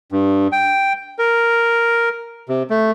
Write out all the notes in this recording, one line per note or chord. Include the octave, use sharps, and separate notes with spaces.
G2
G5
A#4
C3
A3